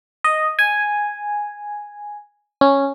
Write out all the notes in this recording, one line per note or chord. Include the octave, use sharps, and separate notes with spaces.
D#5
G#5
C#4